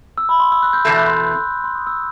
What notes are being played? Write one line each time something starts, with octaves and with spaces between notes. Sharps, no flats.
E6
B5
C6
E6
F#6
G6
E2 B2 A3 G6
F#6
C6
C6
D#6
E6